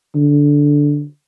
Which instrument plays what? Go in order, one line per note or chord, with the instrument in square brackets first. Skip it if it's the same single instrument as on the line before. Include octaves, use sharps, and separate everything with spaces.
[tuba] D3